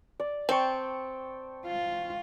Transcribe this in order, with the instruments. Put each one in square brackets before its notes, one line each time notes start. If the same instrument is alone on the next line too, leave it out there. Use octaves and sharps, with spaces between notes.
[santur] D5
[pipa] C4 [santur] G5 A5 C#6
[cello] F4